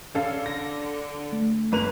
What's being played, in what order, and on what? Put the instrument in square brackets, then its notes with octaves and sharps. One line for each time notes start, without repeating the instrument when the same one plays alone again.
[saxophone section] D3 [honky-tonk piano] C#4 A4 F5
[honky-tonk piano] A#6
[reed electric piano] A3
[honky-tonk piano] G1 B4 F7 [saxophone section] C#3 A#3